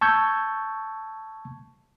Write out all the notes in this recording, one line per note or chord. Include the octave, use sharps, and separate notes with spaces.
A5 C#6 E6 G6 G#6